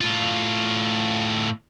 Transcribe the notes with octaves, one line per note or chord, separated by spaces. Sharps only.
A2 F4